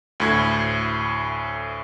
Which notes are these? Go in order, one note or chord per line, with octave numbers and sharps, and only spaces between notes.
D2 A2 G#6